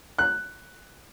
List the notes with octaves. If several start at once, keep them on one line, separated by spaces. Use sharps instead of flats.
F#6